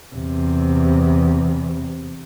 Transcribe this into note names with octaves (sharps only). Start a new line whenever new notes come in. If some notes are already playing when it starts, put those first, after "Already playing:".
E2 C3